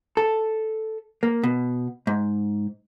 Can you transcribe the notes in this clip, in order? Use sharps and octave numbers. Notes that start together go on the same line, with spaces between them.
A4
A#3
B2
G#2